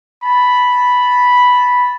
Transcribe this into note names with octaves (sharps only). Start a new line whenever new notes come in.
A5 B5